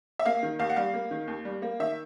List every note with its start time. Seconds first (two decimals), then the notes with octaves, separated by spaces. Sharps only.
0.19 E5
0.26 A#3 F5
0.43 D#3
0.59 D#2 F5
0.70 F#5
0.76 G3 F5
0.94 A#3
1.11 D#3
1.28 D#2
1.45 G3
1.62 A#3
1.80 D#3 E5